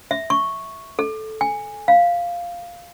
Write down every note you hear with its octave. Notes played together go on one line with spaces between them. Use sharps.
E5
C#6
A4
G#5
F5